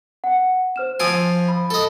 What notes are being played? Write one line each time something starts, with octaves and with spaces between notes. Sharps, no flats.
F#5
C5 F6 E7
F3 G#5 C6 E6 D7 D#7
B5
A4 D#5